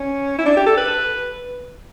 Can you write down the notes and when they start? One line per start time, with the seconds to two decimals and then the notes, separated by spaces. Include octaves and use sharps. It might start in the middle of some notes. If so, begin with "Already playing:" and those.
Already playing: C#4
0.39 E4
0.46 D4
0.57 G4
0.66 A4
0.77 B4